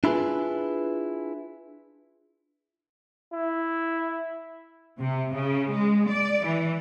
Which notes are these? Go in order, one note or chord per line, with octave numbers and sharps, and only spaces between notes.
D4 E4 F4 G#4 B4
E4
C3
C#3
G#3
D5
E3